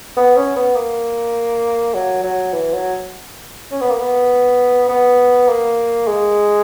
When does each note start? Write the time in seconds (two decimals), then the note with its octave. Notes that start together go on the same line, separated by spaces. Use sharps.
0.17 B3
0.36 C#4
0.56 B3
0.76 A#3
1.94 F#3
2.23 F#3
2.53 E3
2.73 F#3
3.72 C#4
3.81 B3
3.90 A#3
3.99 B3
4.89 B3
5.48 A#3
6.07 G#3